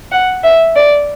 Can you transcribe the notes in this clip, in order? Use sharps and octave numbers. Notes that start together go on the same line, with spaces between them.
F#5
E5
D5